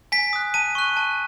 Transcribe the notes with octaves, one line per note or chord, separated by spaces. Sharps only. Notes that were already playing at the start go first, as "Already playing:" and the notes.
G#5 B6
D#6 F#6
A5 D#7
C#6 F#6
A5